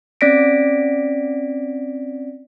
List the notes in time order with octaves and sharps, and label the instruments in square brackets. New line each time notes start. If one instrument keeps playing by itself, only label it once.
[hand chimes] C4 C#4 D5 A#6 B6 D7